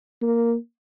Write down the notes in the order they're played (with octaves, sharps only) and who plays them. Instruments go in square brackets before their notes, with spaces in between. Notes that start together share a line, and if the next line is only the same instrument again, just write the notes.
[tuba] A#3